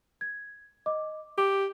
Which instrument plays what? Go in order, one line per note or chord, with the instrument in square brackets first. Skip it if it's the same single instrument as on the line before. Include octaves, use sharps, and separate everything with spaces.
[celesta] G#6
D#5 D6
[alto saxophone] G4 [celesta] D6